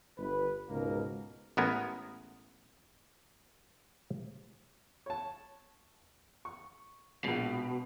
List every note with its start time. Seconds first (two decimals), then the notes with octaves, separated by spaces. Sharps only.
0.18 G1 B4
0.68 C#2 G#2 B2 A#3 A#4
1.57 A1 G#3 B3 A#4 G#5
5.06 C#5 A5
6.45 C#6
7.24 A#1 B2 G#3